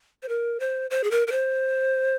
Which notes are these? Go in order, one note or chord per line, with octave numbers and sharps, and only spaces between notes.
C5
A#4
C5
C5
G#4
A#4
A#4
C5